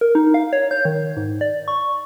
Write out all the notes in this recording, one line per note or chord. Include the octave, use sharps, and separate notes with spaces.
A#4
D#4
F5
C#5
G6
D#3
G#2
D5
C#6